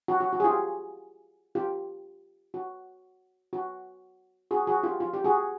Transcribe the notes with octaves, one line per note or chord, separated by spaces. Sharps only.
F#4
F#4
F#4
G#4
F4 G4
F4 G4
F#4
F#4
F#4 G#4
F#4 G#4
F4 G4
F4
G4
F#4 G#4